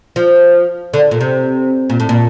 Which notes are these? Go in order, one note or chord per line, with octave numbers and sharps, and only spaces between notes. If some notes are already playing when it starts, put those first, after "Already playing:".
F3
D3
A#2
C3
A#2
A2
A#2